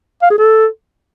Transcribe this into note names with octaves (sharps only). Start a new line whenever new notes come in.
F5
G#4
A4